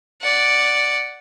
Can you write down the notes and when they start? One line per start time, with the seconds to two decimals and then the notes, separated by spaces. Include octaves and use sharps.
0.22 D5 F#5